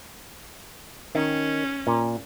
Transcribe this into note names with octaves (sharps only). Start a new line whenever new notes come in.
D#3 C#4
A#2